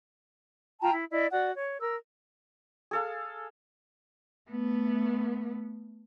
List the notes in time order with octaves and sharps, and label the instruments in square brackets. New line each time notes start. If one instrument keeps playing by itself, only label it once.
[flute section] F4 G5 A5 A#5
E4
E4 D5 D#5
F#4 D5 F#5
C#5
A#4 E6
[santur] G#4 A4 F5
[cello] A3 B3